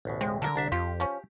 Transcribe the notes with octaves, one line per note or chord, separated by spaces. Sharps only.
A1 D2 B2
G#3 C4
D3 A4 A#4
C2 D4 E5
F2 F4 G4
F3 C#4